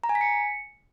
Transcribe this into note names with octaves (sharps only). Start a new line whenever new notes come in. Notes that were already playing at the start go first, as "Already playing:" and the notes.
A#5
G#5
B6
C#7